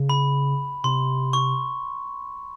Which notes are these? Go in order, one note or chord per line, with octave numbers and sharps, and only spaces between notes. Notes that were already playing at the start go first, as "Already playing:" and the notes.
Already playing: C#3
B5
C3 C6
C#6